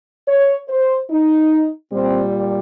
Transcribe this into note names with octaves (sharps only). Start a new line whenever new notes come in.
C#5
C5
D#4
A#2 G3 C4